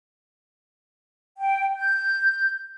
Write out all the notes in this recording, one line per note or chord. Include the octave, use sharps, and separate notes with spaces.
G5
G6